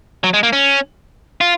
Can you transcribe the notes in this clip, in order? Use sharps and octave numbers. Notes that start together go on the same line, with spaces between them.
F#3
G#3
A#3
C#4
F4